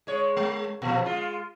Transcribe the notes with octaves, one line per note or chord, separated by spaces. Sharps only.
G#3 C#5
G#3
A#2 F3
G#3 F4